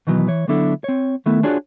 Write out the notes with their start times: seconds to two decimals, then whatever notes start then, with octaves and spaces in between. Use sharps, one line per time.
0.07 B2 D#3 E3 F#3 B3
0.28 E3 C#5
0.48 D3 F#3 B3 D4 E4 A4
0.84 C4 C#5
1.26 D#3 A3 B3 E4 A4
1.43 D4 F4 F#4 G#4 C#5 D5